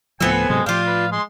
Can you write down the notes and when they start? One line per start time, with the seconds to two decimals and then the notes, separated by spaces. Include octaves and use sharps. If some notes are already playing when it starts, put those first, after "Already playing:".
0.20 D2 A2 F3 B3 C4 E4 A4 G#5
0.32 B4
0.49 G#2 C3 F#3 G#3
0.66 A2 F3 D4 F4 G4 F5
0.86 B4
1.12 G#3 C6